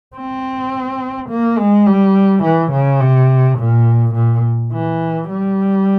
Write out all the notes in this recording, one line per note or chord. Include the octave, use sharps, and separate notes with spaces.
C4
A#3
G#3
G3
E3
C#3
C3
A#2
A#2
E3
G3